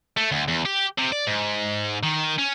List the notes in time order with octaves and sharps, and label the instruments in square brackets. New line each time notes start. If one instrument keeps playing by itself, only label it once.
[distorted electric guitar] A3
D2
E2
G4
C3
D5
G#2
D#3
C#4